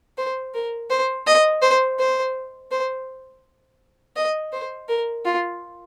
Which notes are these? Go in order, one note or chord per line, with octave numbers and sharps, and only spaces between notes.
C5
A#4
C5
D#5
C5
C5
C5
D#5
C5
A#4
F4